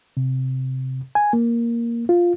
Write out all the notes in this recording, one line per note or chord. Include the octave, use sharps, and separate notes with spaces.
C3
G#5
A#3
F4